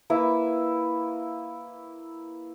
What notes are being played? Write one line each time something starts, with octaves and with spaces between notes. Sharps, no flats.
A#3 E4 B4